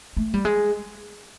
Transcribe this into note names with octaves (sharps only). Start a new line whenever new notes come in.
A3
G3
G#3